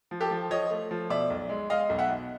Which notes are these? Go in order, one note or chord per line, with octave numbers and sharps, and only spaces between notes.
F3
G4 A4
F3
F3 C#5 D#5
A3
F3
B2 D5 E5
B1
G#3
G#3 D#5 F5
B1
E5 F#5
B2